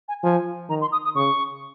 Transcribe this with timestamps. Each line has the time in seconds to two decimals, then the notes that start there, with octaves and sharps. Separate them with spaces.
0.08 G#5
0.23 F3 G#5
0.69 D#3 A#5
0.81 C6
0.92 D#6
1.04 D#6
1.15 C#3 C#6